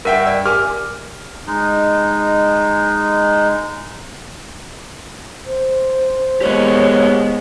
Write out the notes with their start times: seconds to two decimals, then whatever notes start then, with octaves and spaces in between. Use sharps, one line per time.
0.05 G2 A#4 E5 F#5 G5
0.27 D5
0.46 G4 A#4 G#5 D6 F6
1.47 G#3 D#4
5.46 C5
6.41 G#3 B3 G4 A#4 C#5 D#5